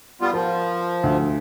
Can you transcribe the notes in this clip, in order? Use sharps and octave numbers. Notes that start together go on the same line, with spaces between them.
G3 B3 F4
F3 A#4
D2